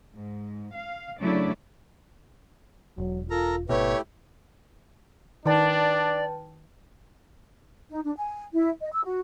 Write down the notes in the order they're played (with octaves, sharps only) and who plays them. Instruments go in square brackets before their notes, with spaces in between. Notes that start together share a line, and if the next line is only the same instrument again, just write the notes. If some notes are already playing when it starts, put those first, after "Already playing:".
[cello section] G#2
F5
C#3 F#3 A3 D4 E4 D5
[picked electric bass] E1 [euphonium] F#3
[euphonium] F4 [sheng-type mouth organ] A4 A#4 A#5
[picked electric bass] G#1 B2 [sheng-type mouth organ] A3 E4 G4 [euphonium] B4 [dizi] C#5
[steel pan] D#3 [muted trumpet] D4 [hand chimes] B4 G5 A5 [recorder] D5
[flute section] D#4
D4
G#5
E4
D#5
E6
F#4